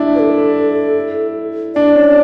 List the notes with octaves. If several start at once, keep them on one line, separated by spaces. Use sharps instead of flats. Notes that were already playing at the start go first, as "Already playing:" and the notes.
Already playing: D4 E4
B4
A4
D4 D5
C#4